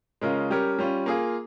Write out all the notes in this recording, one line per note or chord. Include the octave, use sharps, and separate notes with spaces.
C#3 G#3 C#4 F4 A#4
G3 C#4 G4 A#4 C#5
G3 C#4 F4
A#3 F4 G#4